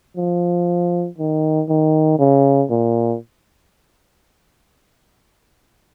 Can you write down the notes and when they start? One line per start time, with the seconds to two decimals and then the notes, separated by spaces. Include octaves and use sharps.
0.17 F3
1.18 D#3
1.69 D#3
2.19 C#3
2.70 A#2